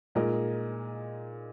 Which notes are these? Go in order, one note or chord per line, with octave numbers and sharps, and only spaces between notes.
A#2 G#3 D#4 A#4 D#5